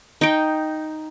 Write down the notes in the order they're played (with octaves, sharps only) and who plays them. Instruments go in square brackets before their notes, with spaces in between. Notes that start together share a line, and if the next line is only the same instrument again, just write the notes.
[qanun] D#4 G5